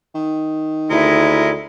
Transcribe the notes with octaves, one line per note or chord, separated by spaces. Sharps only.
D#3
D2 G#3 E4 A#4